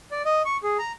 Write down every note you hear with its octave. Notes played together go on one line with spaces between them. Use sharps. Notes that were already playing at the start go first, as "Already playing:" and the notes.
D5
D#5
C#6
G#4
A#5